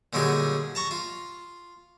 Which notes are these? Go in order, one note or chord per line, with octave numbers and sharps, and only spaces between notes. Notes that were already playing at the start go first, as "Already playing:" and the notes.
A#2 D3 F#3 G3 D#4 G#4
A5 A#5 C#6
F4